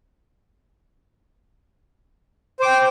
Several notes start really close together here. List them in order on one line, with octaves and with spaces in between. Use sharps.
C5 D6 G5